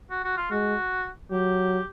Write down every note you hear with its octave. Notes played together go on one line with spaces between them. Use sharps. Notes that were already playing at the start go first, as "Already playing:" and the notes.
F#4
F#4
F4
G#3 F#4
F#3 G4